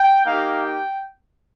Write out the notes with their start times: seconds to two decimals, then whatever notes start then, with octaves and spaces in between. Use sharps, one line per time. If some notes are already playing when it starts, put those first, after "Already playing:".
Already playing: G5
0.24 A#3 D#4 G4 F5
0.61 G5